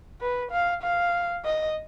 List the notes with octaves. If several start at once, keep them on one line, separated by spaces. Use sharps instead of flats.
B4
F5
F5
D#5